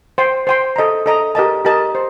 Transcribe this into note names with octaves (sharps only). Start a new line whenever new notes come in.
C5 G5 C6
C5 G5 C6
A4 D#5 A#5
A4 D#5 A#5
G4 A#4 D#5 A5
G4 A#4 D#5 A5
C5